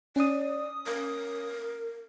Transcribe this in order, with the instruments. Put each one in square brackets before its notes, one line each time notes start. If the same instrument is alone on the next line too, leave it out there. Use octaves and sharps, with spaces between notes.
[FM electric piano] C#4 D#6 [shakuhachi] D5
[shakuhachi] A#4